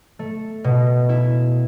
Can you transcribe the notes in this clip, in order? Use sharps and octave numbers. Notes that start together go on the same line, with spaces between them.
A3
B2
E4